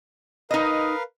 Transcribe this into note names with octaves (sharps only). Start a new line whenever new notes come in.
D#4 A#4 B4 D#5 F5